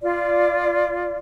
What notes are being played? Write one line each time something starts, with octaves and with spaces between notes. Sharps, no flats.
F4 D5